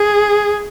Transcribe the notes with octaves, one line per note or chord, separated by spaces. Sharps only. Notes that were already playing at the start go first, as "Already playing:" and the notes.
Already playing: G#4